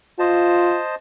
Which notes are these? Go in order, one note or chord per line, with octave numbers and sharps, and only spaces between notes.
F4 C5 D#5 A5